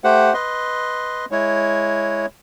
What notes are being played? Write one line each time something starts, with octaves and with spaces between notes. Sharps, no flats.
A3 G4 C5 F#5
B4 D#5 C6
G#3 E4 C#5